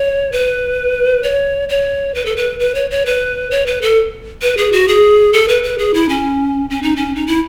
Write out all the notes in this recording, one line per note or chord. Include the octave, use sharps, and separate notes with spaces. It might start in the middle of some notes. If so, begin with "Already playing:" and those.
Already playing: C#5
B4
C#5
C#5
B4
A4
B4
B4
C#5
C#5
B4
C#5
B4
A4
B4
G#4
F#4
G#4
A4
B4
B4
G#4
E4
C#4
C#4
D#4
C#4
D#4
E4